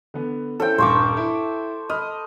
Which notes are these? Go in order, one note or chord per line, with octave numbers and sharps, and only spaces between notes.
D3 B3
C#4 E4 A4 C5 G5
D#1 G2 C5 C#6 D6
E4
D#5 B5 F6